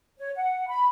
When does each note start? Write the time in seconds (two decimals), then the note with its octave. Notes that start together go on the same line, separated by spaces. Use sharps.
0.19 C#5
0.35 F#5
0.68 B5